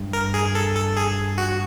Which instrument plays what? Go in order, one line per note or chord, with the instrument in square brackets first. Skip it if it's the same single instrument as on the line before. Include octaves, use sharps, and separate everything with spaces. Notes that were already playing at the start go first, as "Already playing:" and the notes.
Already playing: [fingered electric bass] G2
[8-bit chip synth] A#4
G#4
A4
A4
G#4
F#4